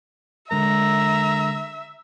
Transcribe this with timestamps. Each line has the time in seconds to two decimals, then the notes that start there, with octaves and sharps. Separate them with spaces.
0.51 D3 G#3 A#4 E5 A#5